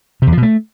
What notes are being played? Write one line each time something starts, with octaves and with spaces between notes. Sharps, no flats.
C3
E2
F3
B2
A3